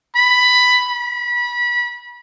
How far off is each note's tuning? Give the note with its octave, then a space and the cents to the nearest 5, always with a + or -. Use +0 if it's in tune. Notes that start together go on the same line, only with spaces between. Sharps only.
B5 +5
B5 -30